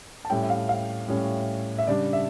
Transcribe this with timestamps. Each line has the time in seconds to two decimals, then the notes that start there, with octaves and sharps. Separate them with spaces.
0.25 A5
0.30 A2 G3 C#4 G5
0.42 E5
0.50 F5
0.69 F5
1.08 A2 G3 C#4
1.78 E5
1.87 C#3 G3 D4 D5
2.13 E5